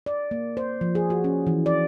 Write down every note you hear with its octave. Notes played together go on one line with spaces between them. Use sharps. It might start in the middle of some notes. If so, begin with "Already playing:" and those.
D5
A#3
C5
F3
G#4
F#4
C#4
E3
D5